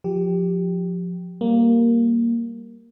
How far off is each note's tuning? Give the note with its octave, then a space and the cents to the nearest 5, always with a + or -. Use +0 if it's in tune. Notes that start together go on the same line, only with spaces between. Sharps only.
F3 +25 G4 +0
G3 +0 A#3 +0